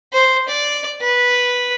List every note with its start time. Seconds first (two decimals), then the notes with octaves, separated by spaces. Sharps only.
0.13 C5
0.48 D5
1.01 B4